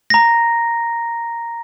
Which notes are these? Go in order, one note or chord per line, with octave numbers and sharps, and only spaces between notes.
A#5 A#6